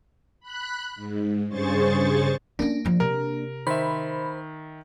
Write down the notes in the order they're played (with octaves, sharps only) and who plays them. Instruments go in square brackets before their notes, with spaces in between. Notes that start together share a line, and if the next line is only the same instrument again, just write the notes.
[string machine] B5 F#6
G#2
G2 C#3 G#4 C5 C#6 A6
[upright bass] A3 C#4 [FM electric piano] A#3 D4
[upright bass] G2 F3
[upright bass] C3 [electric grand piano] A#4
[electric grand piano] D#3 E5 [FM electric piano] C5 B5